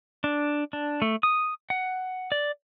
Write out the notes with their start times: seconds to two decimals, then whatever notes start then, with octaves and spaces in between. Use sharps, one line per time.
0.24 D4
0.73 D4
1.02 A3
1.23 D#6
1.70 F#5
2.32 D5